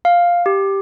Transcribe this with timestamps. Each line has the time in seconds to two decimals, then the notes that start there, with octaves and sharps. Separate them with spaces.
0.05 F5
0.46 G4